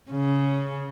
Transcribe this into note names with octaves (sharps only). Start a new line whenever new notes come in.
C#3